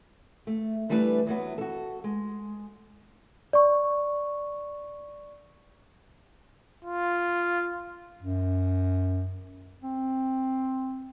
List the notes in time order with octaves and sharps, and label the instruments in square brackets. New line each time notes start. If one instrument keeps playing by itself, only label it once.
[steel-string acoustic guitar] A3
E3 G3 A3 D4 G4 B4
E2 F#3 B3
F#4 A4
G#3
[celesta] D5 C#6
[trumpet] F4
[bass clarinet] F#2
C4